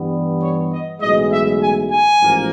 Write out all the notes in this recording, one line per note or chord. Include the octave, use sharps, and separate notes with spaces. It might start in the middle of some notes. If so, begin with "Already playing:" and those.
Already playing: G2 E3 G3 B3
C#5
D#5
B1 A2 E3 G#3 D#5
E5
G#5
G#5
A1 G#2 F3 A#3